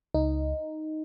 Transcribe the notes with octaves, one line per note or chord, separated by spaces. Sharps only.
C#2 D#4